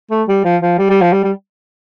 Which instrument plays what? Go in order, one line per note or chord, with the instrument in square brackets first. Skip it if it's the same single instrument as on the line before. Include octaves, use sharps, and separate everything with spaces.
[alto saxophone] A3
G3
F3
F3
G3
G3
F3
G3
G3